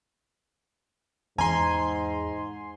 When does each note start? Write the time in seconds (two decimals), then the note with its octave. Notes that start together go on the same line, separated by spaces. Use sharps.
1.38 E2 G#2 G#5 A#5 C6